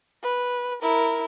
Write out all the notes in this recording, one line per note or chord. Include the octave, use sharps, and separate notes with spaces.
B4
E4 A#4